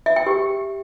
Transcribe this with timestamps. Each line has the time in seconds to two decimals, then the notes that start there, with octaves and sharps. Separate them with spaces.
0.06 E5
0.16 G5
0.27 G4